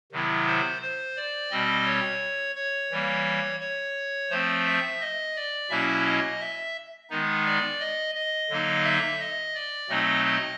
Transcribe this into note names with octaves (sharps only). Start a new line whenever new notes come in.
C3 D#3 F#3 B3 E4
C5
C5
D5
B2 G3 C4 D#5
C#5
C#5
E3 G3 A#3
C#5
F3 A3 C4 C5
E5
D#5
D5
B2 F#3 A#3 C#4 E4 E5
D#5
E5
D#3 G#3 B3 D#4
D5
D#5
D#5
D3 F#3 A#3 D#4
E5
D#5
D5
B2 F#3 A3 C4 D#4 D#5
D#5